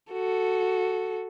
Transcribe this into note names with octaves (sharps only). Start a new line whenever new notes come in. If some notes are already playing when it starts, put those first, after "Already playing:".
F#4 A4